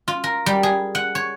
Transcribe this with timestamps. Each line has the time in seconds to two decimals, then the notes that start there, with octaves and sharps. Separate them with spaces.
0.08 F4
0.24 A#4
0.46 G3
0.63 G#4
0.95 F#5
1.15 C#5